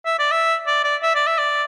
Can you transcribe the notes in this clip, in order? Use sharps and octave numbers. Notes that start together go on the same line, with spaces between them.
E5
D5
E5
D5
D5
E5
D5
E5
D5